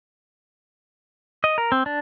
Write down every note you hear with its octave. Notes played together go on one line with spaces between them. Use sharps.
D#5
A#4
C4
D4